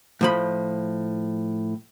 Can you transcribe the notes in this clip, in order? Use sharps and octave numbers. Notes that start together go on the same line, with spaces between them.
A2 F3 B5